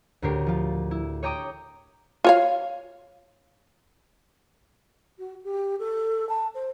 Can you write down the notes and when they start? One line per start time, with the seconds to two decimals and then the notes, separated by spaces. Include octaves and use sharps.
0.22 D2 A2 G4 A#4 C7
0.46 F3 F4
0.91 E4
1.23 C#5 D#5 G5 A#5 D6 D#6
2.25 F4 C#5 F5
5.19 F#4
5.44 G4
5.79 A4
6.29 A5
6.55 C5